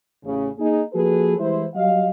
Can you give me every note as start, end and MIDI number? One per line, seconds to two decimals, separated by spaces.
0.24 0.49 33
0.24 0.49 49
0.59 0.82 58
0.59 0.82 63
0.59 0.82 68
0.93 1.34 53
0.93 1.34 58
0.93 1.34 66
0.93 1.34 68
0.93 1.34 69
0.93 1.34 71
1.38 1.65 52
1.38 1.65 55
1.38 1.65 56
1.38 1.65 64
1.38 1.65 72
1.75 2.09 54
1.75 2.09 55
1.75 2.09 75
1.75 2.09 77